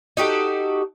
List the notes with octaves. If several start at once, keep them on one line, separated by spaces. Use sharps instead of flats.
D#4 F#4 G4 A4